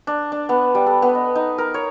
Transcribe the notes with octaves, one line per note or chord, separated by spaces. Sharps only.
D4
D4
B3
G3
A4
B3
D#5
D#4
A#4
C#5